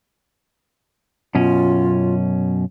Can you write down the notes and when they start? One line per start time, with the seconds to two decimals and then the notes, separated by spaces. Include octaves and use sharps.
1.35 F#2 B2 C#4 F4